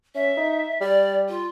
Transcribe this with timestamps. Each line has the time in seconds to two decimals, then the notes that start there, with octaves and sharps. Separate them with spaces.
0.15 C#4 E5
0.37 D#4
0.81 G3 D5
1.29 F4